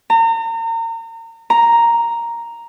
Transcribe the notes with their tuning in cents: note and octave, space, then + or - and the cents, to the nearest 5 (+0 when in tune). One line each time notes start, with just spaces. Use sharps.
A#5 -35
A#5 +0